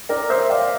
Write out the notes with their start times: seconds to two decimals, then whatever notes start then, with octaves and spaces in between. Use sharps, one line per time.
0.09 A#4 D5
0.30 C5 E5
0.50 D5 F5